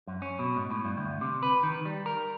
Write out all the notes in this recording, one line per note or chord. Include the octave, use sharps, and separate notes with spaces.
F#2
C#4
B2
G#2
A2
G2
D2
C3
B4
D#3
G3
A#4